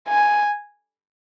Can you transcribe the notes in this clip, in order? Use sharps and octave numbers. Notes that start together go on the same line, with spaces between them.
G#5